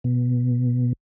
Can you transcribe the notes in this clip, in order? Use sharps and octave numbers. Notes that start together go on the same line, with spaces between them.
B2